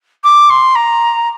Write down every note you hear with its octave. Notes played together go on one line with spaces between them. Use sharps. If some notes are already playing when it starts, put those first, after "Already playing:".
D6
C6
A#5